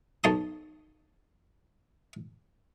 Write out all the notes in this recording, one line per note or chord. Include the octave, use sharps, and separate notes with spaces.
B1 C#5 A5 C6 D#6